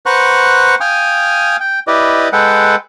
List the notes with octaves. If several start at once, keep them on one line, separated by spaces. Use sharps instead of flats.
B4 C5 F#5 A#5 C#6 F#6
F5 G5 G#5 D#6 F6
G5
E4 G4 B4 D5 D#5
G#3 G#4 A4 B4 F#5 G5